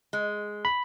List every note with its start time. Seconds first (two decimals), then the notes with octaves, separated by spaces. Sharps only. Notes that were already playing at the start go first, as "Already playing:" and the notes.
0.13 G#3
0.65 B5